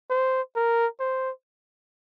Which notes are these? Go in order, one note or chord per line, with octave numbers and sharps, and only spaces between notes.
C5
A#4
C5